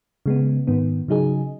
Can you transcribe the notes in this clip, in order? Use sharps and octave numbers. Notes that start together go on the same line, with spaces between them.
C#3 G#3 B3
G#2 D#3 B3
C#3 F#3 D#4 G#4